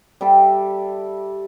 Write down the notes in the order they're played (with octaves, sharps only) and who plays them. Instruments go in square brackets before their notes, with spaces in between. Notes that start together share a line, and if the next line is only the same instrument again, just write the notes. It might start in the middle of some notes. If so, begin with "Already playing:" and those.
[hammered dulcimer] G3 A4 E5